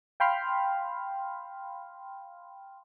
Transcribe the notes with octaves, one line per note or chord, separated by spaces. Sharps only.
F5 G5 B5 C6 F6